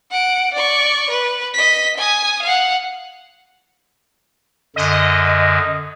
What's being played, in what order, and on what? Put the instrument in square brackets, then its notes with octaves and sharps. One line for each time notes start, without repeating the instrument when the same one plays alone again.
[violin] F#5 D7
D5 C#6
B4
D#5 B6
G#5 D#6
F5 F#5
[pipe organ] F#2 D3 [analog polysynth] D#5